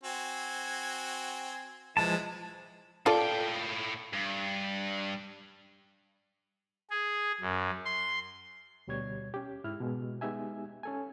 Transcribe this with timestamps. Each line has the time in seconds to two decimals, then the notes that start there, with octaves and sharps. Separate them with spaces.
0.04 C4 F#4 G#5
1.97 E3 F3 G#3 A5
3.06 A2 F4 A4 D5 G5
4.14 G2
6.90 G#4
7.41 F#2
7.85 C6
8.87 D2 B2 G3 C#5 G#6
9.34 C#4 G4
9.64 G#2 E4 F6
9.80 B2 G#3
10.21 G#3 B3 D#4 G4 E5 G#5
10.83 C#4 A4 G#5